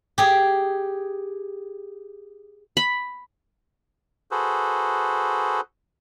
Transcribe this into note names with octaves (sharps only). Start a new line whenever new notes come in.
G4 G#4
B5
F#4 G#4 A4 B4 C5